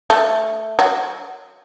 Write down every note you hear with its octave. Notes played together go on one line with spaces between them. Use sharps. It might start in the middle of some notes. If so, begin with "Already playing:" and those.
A3
F#3